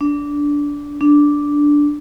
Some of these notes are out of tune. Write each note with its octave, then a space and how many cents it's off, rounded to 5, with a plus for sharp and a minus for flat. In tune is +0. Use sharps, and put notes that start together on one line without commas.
D4 -15
D4 -5